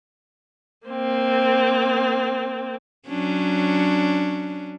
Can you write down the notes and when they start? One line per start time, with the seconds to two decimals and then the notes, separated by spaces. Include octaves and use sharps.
0.87 A#3 C4
3.08 F#3 C#4 D4